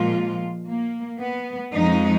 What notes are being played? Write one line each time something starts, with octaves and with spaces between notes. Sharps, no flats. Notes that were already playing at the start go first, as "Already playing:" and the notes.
Already playing: A#2 F3 G#3 F4
A#3
B3
F2 F3 G#3 D#4